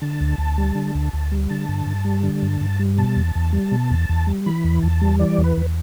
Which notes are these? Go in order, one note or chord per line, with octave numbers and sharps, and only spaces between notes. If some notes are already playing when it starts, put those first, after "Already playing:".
D3 A5
D2
D2
G3
D3
D2
D2
G3
D3 A5
G2
G2
G3
D3
G2
G2
G3
B2 A5
E2
E2
G3
B2
E2
E2
G3
E3 B5
E2
E2 A5
G3
E3 D5
E2
B4
E2